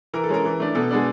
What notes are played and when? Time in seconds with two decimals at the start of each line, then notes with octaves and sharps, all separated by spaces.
0.14 E3 A#4
0.23 A4
0.29 G#3 C#4 A#4
0.45 E3
0.60 A3 D4
0.75 B2 A4
0.91 G#3 B3 D4